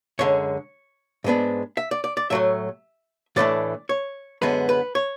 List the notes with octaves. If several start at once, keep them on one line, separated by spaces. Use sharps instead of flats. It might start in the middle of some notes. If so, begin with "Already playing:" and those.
F#2 D3 G#3 C#5
G#2 G#3 B3 D4
E5
D5
D5
D5
A2 F#3 A3 E5
A2 E3 A3 D4 D5
C#5
F#2 D3 G#3 B3 B4
B4
C#5